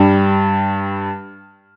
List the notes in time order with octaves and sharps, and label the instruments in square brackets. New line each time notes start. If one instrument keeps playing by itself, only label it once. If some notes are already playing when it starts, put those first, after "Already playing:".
Already playing: [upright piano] G2 G3